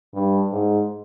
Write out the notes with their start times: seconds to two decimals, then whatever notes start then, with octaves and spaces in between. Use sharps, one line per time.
0.14 G2
0.52 G#2